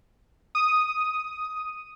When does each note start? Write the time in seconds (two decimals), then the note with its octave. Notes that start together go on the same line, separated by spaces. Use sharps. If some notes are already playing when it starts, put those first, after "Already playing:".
0.55 D#6